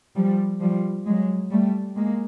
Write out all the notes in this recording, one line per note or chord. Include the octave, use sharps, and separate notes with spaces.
F3 G3
F3 G3
F#3 G#3
G3 A3
G#3 A#3